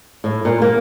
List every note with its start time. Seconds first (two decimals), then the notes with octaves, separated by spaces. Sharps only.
0.24 A2
0.45 A#2
0.62 A#3